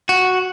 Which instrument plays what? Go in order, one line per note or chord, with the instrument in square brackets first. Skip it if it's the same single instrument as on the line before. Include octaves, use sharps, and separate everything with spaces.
[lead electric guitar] F#4